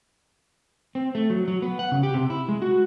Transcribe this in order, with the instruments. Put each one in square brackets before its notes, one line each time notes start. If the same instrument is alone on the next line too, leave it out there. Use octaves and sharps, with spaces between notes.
[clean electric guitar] C4
A3
F#3
F#3
B3
F#5
C#3
G4
C3
E4
G#3
F#4